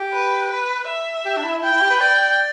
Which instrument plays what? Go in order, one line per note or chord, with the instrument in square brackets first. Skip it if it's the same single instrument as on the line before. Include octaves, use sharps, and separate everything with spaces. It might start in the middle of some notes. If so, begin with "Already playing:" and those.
Already playing: [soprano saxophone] G4
[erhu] B4
B4
E5
[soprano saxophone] G4
D4
E4
[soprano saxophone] E4 [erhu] G5
[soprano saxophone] E4
G4
B4
[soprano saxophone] D5 [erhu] G5